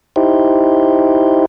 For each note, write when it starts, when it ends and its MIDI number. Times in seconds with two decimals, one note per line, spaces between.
0.16 1.46 63
0.16 1.46 64
0.16 1.46 67
0.16 1.46 72